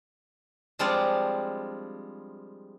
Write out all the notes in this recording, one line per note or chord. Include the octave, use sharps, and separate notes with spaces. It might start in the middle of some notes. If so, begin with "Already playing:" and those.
F3 G3 G#3 C4 D4 F4